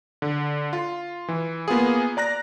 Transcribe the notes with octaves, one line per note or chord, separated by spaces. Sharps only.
D3
F4
E3
A#3 B3 F4 G#4
D5 A#5 F#6 A#6